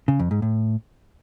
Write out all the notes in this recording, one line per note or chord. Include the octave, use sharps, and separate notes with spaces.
C#3
F2
G#2
A2